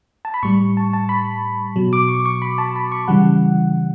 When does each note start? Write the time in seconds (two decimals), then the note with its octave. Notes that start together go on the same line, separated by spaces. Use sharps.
0.25 A5
0.34 B5
0.43 A2 G3 C#6
0.77 A5
0.93 A5
1.09 B5
1.76 B2 F#3
1.93 D6
2.08 C#6
2.25 C#6
2.42 B5
2.58 A5
2.76 B5
2.92 C#6
3.08 C#3 E3 G3 F#5